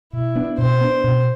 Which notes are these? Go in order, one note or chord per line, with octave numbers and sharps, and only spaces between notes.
B2 E4
B3 D4
B2 C5
B3 D4
B2